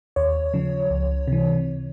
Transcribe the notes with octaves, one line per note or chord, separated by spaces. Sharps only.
D#2 C#5
C#3 F3
C#2
C3 E3